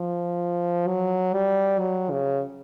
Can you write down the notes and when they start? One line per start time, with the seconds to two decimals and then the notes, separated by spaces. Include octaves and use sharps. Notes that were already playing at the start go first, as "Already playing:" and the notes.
Already playing: F3
0.87 F#3
1.33 G3
1.79 F#3
2.11 C#3